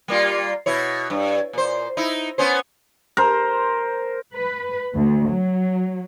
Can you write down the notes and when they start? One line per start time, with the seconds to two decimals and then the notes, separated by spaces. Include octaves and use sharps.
0.08 G3 A#3 F4
0.66 B2 E4 C#5
1.10 G2
1.53 A#2 C5
1.97 D#4 E4
2.38 B3 C#4 C5
3.17 A#4 C5
4.35 B4
4.95 D2
5.29 F#3